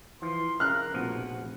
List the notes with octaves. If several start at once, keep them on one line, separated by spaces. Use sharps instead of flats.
E3 F3 C6
C#3 A#4 F6 F#6
F1 A#1 B2 F3 F#5